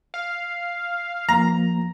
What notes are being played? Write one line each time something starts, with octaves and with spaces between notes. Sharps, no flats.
F5
F3 A#3 A#5